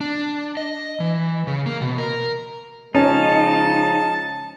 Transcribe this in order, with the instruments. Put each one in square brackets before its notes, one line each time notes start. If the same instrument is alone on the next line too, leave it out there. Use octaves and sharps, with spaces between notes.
[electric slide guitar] D4
D#5
E3
C#3
A#3
B2
A#4
[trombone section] C#3 F3 G#3 [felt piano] C#4 [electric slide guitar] D#4 [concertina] A5